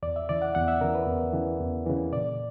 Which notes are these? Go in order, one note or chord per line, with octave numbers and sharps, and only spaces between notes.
E2 D5
E5
C#3 E3 D5
F#5
E2 F#5
E5
C#3 E3 A#4
B4
E2
C#3 E3
E2
C#3 E3
A#2 D5